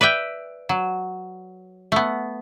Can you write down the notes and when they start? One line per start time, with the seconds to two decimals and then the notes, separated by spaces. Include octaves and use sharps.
0.01 B4 D5 E5 G5
0.69 F#3
1.92 A3 B3